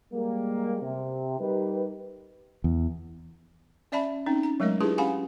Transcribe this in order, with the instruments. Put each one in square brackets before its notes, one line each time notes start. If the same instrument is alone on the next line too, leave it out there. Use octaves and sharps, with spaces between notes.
[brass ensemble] G3 G#3 A#3
C3
G3 D#4 G4 A#4 B4
[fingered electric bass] E2
[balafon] C#4 D5 E5 A5 B5
C4 C#4 D#4
A#5
F#3 G#3 A3 A#4 D#5
D4 E4 F4 G4 G#4 B4
C#4 G4 F5 F#5 G#5 B5